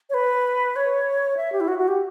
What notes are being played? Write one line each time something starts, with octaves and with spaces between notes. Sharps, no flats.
C#5
B4
C#5
E5
G4
E4
F#4
F#4
G4